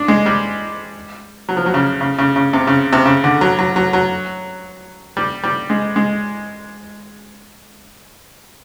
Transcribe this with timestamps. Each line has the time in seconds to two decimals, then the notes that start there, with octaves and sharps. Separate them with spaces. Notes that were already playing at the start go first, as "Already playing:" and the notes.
Already playing: D4
0.08 G#3
0.26 G3
1.49 F#3
1.57 F3
1.66 F#3
1.74 C#3
2.01 C#3
2.19 C#3
2.36 C#3
2.53 C3
2.67 C#3
2.93 C3
3.06 C#3
3.24 D3
3.41 F#3
3.59 F#3
3.76 F#3
3.93 F#3
5.17 G3
5.43 G3
5.70 G#3
5.96 G#3